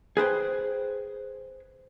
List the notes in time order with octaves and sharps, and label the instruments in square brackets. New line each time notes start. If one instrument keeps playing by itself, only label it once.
[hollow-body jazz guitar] G#4 B4 C5 G5